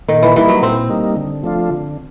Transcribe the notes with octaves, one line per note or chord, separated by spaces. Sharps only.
A#2 D#3
E3
E3 G3 A#3 D#4
F#3
A#2 C4
G3 A#3 D#4
D3
F3 A3 D4 F4
D3